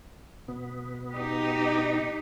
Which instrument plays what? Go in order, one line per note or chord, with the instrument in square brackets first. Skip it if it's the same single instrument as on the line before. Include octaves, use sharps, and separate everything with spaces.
[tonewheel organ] B2 B3
[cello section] D#4 G4